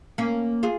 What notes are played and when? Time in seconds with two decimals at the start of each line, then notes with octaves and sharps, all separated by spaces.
0.18 A#3 C#4
0.63 F4 G#4